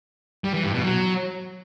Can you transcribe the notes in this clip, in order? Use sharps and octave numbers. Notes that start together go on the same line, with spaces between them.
G3
E3
G2
B2
F#3